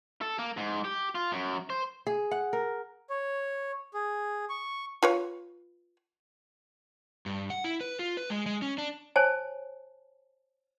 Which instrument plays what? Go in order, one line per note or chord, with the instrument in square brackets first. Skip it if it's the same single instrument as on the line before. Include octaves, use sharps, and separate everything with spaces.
[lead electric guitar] A4
A#3
G#2
G4
F4
F#2
C5
[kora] G#4
F#5
A#4
[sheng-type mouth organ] C#5
G#4
C#6
[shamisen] F4 B4 C#5
[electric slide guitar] G2
F#5
E4
B4
F4
B4
G#3
G#3
C#4
D4
[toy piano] C5 C#5 G#5 A5